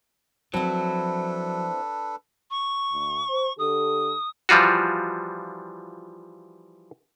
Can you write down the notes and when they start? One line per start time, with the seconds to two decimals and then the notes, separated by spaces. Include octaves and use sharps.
0.54 F3 F#3 C4 D4 E4 A4 B4
2.51 C#6
2.92 D2
3.29 C5
3.59 D3 G4 A4 D#6
4.49 E3 F3 G3 F4 F#4